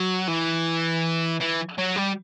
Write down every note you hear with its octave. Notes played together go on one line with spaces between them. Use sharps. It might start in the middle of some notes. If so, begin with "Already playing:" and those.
Already playing: F#3
E3
E3
F#3
G3